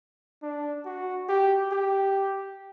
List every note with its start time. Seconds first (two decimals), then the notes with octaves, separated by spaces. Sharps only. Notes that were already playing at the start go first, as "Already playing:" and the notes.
0.43 D4
0.85 F#4
1.29 G4
1.72 G4